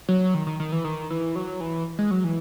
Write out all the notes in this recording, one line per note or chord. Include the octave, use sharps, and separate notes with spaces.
F#3
D#3
D#3
D#3
E3
D#3
E3
F#3
E3
G#3
F#3
E3